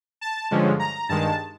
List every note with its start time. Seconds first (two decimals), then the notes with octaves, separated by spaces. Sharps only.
0.21 A5
0.51 G2 D3 F3 G#3 C#4
0.79 A#5
1.09 G2 D#3 G#3 A5